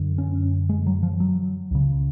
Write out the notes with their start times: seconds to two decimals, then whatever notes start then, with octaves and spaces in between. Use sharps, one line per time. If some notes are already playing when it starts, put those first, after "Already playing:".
Already playing: F#2 D3
0.18 C#4
0.69 G#3
0.87 F#3
1.03 F3
1.20 F#3
1.71 C#2 C#3